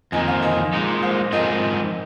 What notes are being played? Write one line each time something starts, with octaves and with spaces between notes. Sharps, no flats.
F2 D#3 A#3 D#5 G#5
C5 F5
D#5 G#5
A#2 G#3 D#4
C5 F5
G#2 F3 C4 D#4 G#4 A#4 D#5